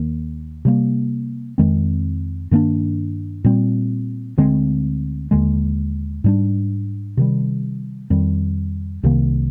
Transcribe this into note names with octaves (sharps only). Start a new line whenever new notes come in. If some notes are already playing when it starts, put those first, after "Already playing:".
Already playing: D#2 D#3 A#3
C3 G3 A#3
F2 D#3 G#3 C4
G2 D#3 A#3 D4
A#2 G3 C4
D2 D3 G#3 C4
D#2 D3 G#3
G#2 G3 D4
C3 D#3 G3
F2 D#3 G3
C2 C3 D#3 A#3